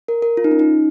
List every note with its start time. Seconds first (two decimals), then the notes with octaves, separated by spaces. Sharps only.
0.08 A#4
0.22 A#4
0.37 F4
0.44 D#4
0.51 C#4
0.59 D#4